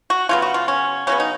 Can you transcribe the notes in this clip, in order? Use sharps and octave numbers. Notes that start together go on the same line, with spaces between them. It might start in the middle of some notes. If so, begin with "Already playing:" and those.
F#4
C#3 F#3 B3 F4
F#4
F4
C#4
C#3 F#3 B3 C#4
D#4